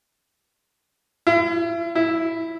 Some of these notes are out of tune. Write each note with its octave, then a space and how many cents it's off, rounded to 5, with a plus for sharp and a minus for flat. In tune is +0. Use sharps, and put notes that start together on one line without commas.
E4 +40
E4 +0